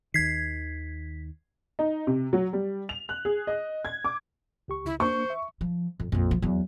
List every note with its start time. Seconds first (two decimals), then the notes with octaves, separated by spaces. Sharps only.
0.14 D#2 D#3 G#6 B6 C7
1.79 D#4
2.07 C3
2.33 F#3
2.53 G3
2.89 F7
3.09 F#6
3.25 G#4
3.47 D#5
3.85 G#6
4.05 D6
4.68 C#2 G4 C#6
4.86 C#2 E4
5.00 A#3 D4 C5 C#6
5.30 E5
5.61 F3
6.00 F2
6.12 A#1 F2
6.31 F3
6.42 E2 F#3